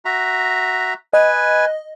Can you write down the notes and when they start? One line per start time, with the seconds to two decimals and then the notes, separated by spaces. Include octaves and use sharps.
0.05 F#4 E5 A#5
1.13 B4 D#5 G#5